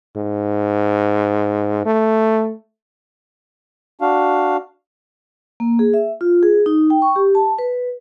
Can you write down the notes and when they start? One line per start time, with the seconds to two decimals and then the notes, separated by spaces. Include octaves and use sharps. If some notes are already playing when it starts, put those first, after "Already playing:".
0.16 G#2
1.85 A3
4.01 D4 F#4 F5
5.60 A#3
5.79 G#4
5.94 E5
6.21 F4
6.43 G#4
6.66 D#4
6.90 G5
7.02 C#6
7.16 G4
7.35 A5
7.58 B4